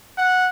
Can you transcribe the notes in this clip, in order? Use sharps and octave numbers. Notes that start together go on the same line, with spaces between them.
F#5